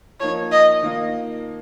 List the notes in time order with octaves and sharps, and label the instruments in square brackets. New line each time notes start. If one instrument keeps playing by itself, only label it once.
[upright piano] F3 A#3 D#4 [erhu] C#5
[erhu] D#5
[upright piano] D#3 A#3 F4